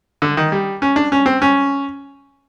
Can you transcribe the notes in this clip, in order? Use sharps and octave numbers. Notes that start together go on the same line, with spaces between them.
D3
D#3
G3
C#4
D4
C#4
C4
C#4